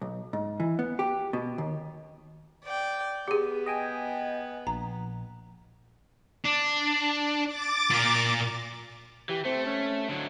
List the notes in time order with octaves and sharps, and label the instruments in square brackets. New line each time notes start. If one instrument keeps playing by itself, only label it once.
[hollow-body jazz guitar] B1
G#2
E3
B3
G4
B2
D#2
[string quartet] D5 G5
[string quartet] B3 [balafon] G4 G#4
[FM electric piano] D#5 G5 G#5
[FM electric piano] A#1 [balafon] A#5
[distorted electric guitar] D4
[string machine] D6 A6
[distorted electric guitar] A#2 A#4
[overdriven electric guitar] E3 [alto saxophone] G4
[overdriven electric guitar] A3 [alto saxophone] C4
[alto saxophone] C#4
[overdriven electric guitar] D3 F#3